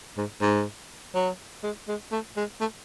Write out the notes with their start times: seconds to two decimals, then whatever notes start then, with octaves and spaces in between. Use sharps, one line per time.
0.17 G#2
0.41 G#2
1.15 F#3
1.63 G#3
1.88 G#3
2.12 A3
2.37 G#3
2.61 A3